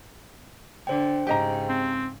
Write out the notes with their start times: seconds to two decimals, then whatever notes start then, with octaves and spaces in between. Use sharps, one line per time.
0.87 D3 C5 G5
1.27 G#2 C#3 G4 D#5 A#5
1.69 C4